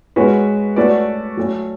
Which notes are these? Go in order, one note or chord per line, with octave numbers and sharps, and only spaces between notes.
G#3 C#4 F#4 B4
A3 C#4 F#4 B4 D5
F#3 A3 C#4